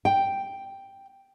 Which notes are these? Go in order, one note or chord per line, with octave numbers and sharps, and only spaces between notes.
G5